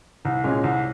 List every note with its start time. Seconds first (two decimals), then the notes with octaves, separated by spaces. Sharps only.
0.25 C2
0.44 A#2 G#3 C#4
0.64 C2